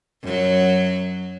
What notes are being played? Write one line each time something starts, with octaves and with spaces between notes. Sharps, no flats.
F#2 F#3